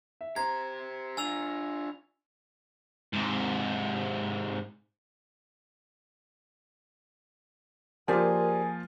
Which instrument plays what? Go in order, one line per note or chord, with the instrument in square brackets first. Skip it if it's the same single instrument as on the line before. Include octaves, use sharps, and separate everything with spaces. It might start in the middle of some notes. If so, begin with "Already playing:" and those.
[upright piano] E5
[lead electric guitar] G4 C5 [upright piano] A#5 [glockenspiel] G#6
[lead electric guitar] D4 F4 [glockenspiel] G#5 E6 F7
[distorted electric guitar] G#2 C3
[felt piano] F3 A#3 F4 [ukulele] G4 C5 D5 [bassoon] G#4 [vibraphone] A#4